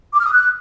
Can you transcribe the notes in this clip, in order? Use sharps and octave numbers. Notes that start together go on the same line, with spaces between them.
D6
F6
D#6
F#6